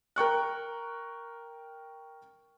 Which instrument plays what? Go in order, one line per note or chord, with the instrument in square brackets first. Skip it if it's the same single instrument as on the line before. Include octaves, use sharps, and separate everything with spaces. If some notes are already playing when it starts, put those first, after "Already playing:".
[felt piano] A#4 G5 C#6 F#6